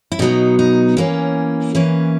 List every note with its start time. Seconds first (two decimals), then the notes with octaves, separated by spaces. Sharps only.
0.12 E4
0.19 B2 F#3 B3 D#4
0.59 D#4
0.97 E3 A#3 C#4
1.75 E3 A#3 C#4 B4